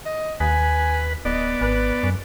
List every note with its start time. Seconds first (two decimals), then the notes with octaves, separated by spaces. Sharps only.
0.06 D#5
0.40 D#2 B4 G#5
1.25 D1 B3 D5 D#5
1.61 G#1 B4
2.03 F#2